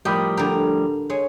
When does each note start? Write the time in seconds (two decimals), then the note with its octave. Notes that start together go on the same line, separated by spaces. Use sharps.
0.05 A2 F3 G3 G4 A#4 B5 D#6
0.37 D3 G4 A#5
1.10 G#3 C#5